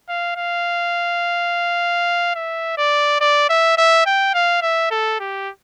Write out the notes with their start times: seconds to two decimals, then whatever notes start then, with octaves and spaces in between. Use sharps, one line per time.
0.09 F5
0.36 F5
2.35 E5
2.78 D5
3.21 D5
3.50 E5
3.77 E5
4.06 G5
4.34 F5
4.62 E5
4.91 A4
5.20 G4